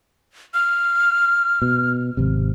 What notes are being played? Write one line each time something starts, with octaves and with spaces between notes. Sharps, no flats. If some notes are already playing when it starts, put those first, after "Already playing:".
F6
B2
G#1 C3